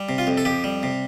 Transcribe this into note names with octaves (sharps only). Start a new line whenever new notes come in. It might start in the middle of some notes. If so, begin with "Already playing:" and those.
Already playing: G3
C3
F4
F2
A4
F2 G4
G3
C3